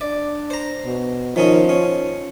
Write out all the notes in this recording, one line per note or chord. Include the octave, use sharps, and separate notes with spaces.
D4 D5
C5 A#5
B2
D#3 F3 C#4 D#4
C#4